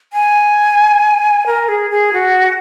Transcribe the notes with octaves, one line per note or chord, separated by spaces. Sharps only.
G#5
A#4
G#4
G#4
F#4